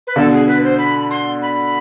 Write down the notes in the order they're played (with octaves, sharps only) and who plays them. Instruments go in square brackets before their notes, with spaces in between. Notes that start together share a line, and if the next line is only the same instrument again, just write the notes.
[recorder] B4
[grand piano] B2 D3 [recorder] A4
[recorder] G#4
B4
C5
B5
C6
B5